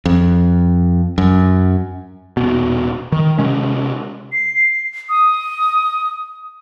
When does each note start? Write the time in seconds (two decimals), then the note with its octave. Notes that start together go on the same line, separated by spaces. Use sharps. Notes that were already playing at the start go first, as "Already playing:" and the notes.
0.05 F2
1.18 F#2
2.37 D#1 B2
3.12 D#3
3.38 C3 G#3 C#4
4.32 C7
5.09 D#6